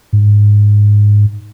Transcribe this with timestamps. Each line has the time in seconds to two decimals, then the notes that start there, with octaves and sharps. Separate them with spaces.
0.13 G#2